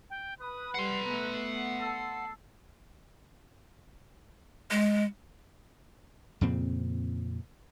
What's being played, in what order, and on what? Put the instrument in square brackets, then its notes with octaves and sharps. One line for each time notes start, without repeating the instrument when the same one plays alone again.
[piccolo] G5
[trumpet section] B4 [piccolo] D#6
[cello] G3 [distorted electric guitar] F#5 C6 [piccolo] C7
[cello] A3 B3 [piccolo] A#5
[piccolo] C7
[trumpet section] A4
[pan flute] G#3
[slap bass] F2 A#2 C#3 C4